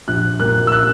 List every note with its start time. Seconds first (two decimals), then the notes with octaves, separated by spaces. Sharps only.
0.08 A#1 F#6
0.40 A#2 A#3 F#6
0.67 E6
0.72 F#6